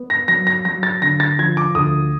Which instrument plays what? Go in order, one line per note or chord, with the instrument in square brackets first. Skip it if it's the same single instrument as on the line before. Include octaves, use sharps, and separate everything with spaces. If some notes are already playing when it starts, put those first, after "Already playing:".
Already playing: [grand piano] B3
A#6
F#3 A#6
A#6
F#3 A#6
A6
D3 A#6
A6
F3 G#6
D6
D2 D#6